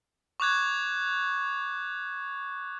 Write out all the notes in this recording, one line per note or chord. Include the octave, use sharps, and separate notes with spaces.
C#6 D6 F#6 G#6